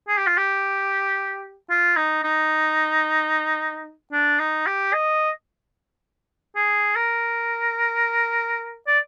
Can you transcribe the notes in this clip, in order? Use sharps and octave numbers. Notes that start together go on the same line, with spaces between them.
G#4
G4
F4
G4
F4
D#4
D#4
D4
D#4
G4
D#5
G#4
A#4
D5